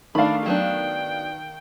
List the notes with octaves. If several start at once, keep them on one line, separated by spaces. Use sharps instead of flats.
D#3 A3 D4 D5 F5 B5
F#3 B3 D4 G5